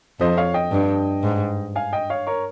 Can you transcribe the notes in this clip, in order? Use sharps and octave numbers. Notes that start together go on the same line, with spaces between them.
F2 C5 D#5
C#5 F5
D#5 G5
G2
G#2
F5 G#5
D#5 G5
C#5 F5
A#4 C#5